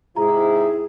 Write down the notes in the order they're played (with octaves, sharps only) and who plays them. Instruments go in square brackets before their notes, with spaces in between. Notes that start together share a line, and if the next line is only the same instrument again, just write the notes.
[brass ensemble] G#2 C3 E4 [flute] G#4 [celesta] A#5